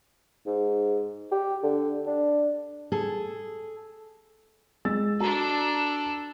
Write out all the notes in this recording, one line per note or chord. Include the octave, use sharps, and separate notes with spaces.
G#2
G4
D3
D4
G#4 A4
G#3 E6 A6
D4 F#4 A4 A5 A#5